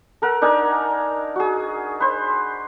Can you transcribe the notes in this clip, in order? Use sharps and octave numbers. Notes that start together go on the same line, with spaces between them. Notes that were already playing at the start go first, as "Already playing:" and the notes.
A4 A#4 F#5
D4 D#4 A#4 G#5
F#4 G#4
B4 C5